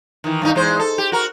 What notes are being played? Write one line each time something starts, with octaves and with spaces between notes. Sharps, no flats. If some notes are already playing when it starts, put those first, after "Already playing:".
D#3 E3
G2 D#3 D#4
E2 G#3 C5
A4
G4
F#4 A#4